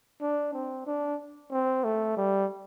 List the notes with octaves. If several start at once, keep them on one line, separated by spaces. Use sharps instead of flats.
D4
C4
D4
C4
A3
G3